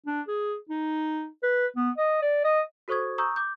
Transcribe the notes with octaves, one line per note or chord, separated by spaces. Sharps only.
D4
G#4
D#4
B4
B3
D#5
D5
D#5
F#4 A4 C5 C#6 D#6 G#6
A#5 C#6 D#6 E6 G6
D6 G6